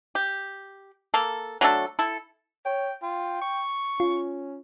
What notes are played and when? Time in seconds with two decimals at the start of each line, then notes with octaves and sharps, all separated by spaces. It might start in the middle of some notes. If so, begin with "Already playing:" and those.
0.15 G4
1.14 A#3 A4
1.61 F#3 A3 D4 A4
1.99 E4 A4
2.65 C#5 G5
3.03 F4 G5
3.41 C#6
4.00 C#4 F4